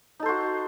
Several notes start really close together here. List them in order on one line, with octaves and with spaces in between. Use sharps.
D#4 A4 C5 F#4